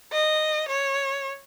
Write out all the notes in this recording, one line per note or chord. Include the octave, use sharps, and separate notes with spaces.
D#5
C#5